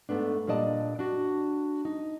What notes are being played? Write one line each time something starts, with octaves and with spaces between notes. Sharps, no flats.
G#2 B2 A3 B3 D4
A#2 G3 D4 D5 D#5 A5
D4 F#4
D#4